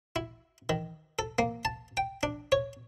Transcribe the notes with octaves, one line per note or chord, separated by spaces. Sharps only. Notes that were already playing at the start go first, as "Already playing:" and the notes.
E4
D#3
A4
A#3
A5
G5
D4
C#5